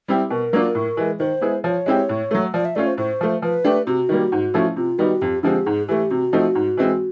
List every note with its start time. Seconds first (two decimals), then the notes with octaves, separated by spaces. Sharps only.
0.08 G3 C4 E4 G4
0.30 B2 A#4
0.53 F#3 A#3 D4 F4
0.75 A2
0.97 E3 G#3
1.19 D#3 C5
1.41 G#3 B3 E4 G#4
1.64 F3 C#5
1.86 G#3 C4 E4 G4
2.09 A2
2.31 F#3 A3
2.54 F3 D5
2.65 E5
2.75 A3 C#4 F4 D5
2.87 C5
2.98 A2 C5
3.21 F3 A3
3.42 F3 B4
3.64 A3 D4 G4
3.87 C3 F#4
4.09 D#3 G3 A#3
4.32 G#2
4.54 F3 A3 C#4 E4
4.76 C3 F4
4.98 D#3 G3 B3 D#4 F#4
5.21 F2 G4
5.43 D3 F3 G#3 C4 G4
5.66 G#2 G#4
5.88 E3 A3 G4
6.10 C3 F#4
6.33 F3 A3 C4 D#4
6.55 G#2
6.77 E3 G#3 C4